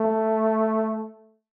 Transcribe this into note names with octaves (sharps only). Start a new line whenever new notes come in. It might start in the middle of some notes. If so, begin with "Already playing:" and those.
Already playing: A3